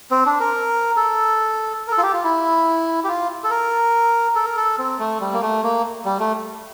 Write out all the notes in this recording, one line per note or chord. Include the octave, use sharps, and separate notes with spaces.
C4
D4
A#4
A4
A#4
A4
F4
G4
F4
E4
G4
F4
A4
A#4
A4
A#4
A4
C4
A3
G3
A#3
A3
A#3
G3
A3